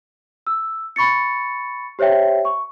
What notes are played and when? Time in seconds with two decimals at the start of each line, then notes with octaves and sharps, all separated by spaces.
0.47 E6
0.96 B5 C#6 A6 C#7
1.99 G4 C5 C#5 E5 G5
2.45 C#6